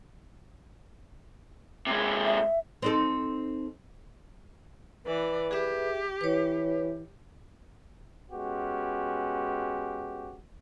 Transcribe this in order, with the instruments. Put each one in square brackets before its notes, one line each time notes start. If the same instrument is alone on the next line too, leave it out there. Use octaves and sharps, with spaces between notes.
[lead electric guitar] C3 G#3
[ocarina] E5
[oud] C4 D#4 A4
[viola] E3 D5 [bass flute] B4
[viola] G4 [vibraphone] G#4 E5
[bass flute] E3 [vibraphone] B4 C#5
[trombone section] G#3 B3 C#4 F#4 G4